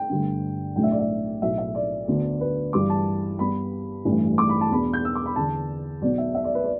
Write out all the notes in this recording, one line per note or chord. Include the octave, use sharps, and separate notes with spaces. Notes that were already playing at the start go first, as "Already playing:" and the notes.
Already playing: G5
G1 G2 D3 A3 D4
B1 A2 A3 D4 G5
E5
D5
E5
B1 A2 A3 E5
E5
D5
D2 D3 B3 D4
B4
G1 G2 E3 G3 D4 D6
A5
G2 G3 B3 B5
A1 G2 E3 A3 D4
D6
B5
A5
E2 B2 B3 D4 B5
G6
E6
D6
B5
E2 D3 B3 D4 A5
B1 B2 B3 D5
E5
E5
D5
B4
D5